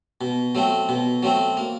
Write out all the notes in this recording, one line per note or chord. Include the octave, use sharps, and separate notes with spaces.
B2
F#3 A3 C4
B2
F#3 A3 C4
A#3